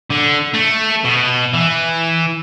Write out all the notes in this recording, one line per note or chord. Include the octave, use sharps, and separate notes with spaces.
D3
A3
B2
E3